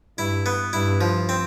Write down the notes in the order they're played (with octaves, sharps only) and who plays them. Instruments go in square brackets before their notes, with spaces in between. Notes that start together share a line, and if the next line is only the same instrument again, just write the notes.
[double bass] G2 [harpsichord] E4
[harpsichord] B3
[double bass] G2 [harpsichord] E4
[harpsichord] F3
C4